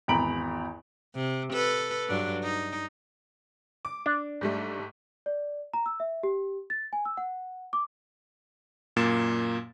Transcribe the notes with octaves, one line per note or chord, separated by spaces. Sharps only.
G#1 E2 A#5 B5 D7 F#7
C3
A4 B4
G2 F#3 D4
D#4
D6
D4
G#2 G3 A3
D5
A#5
E6
E5
G4
A6
G#5
E6
F#5
D6
F#2 A#2 A#3 A6 E7